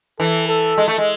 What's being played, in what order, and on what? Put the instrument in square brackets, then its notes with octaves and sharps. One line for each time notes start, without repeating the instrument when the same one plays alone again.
[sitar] E3 [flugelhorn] A4
[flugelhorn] A4
[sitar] G#3
A3
G#3